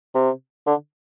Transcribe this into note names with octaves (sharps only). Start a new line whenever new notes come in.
C3
D3